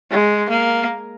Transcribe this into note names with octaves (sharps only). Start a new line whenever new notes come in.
G#3
A#3